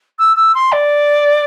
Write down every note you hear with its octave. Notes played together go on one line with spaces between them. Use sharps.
E6
E6
C6
D5